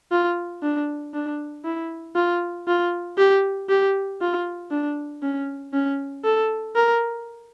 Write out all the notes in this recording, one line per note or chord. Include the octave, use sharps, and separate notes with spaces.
F4
D4
D4
E4
F4
F4
G4
G4
F4
D4
C#4
C#4
A4
A#4